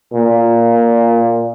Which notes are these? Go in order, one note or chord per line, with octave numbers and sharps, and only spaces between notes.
A#2